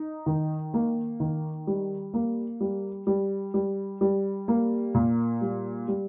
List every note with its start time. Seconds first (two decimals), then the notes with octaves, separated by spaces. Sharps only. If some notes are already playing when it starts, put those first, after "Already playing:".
Already playing: D#4
0.26 D#3
0.74 A#3
1.20 D#3
1.67 G3
2.14 A#3
2.60 G3
3.07 G3
3.54 G3
4.01 G3
4.48 A#3
4.94 A#2
5.41 G3
5.88 G3